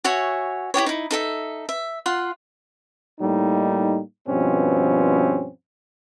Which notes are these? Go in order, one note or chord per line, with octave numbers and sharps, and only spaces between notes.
F#4 C#5 E5 G#5
E4 F#4 G4 C#5
D#4 E4
D#4 A4 E5
E5
F4 F#5 C6
A2 G3 A#3 D#4
G2 B2 F3 C4 C#4